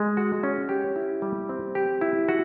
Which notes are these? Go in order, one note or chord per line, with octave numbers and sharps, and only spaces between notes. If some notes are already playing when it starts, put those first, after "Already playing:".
Already playing: G#3
F#4
C#4
G4
E4
G3
C4
G4
E4
F#4